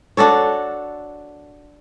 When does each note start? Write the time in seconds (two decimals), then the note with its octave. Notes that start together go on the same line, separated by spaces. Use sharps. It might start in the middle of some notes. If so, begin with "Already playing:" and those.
0.17 D4 F#4 A4 C#5